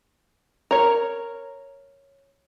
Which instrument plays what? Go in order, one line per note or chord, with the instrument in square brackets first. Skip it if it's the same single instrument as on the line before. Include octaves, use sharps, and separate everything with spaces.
[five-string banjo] A#4 C#5